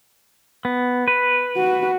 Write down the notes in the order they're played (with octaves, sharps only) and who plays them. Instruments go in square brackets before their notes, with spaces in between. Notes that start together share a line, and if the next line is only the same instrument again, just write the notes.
[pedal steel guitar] B3
B4
[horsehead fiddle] F#4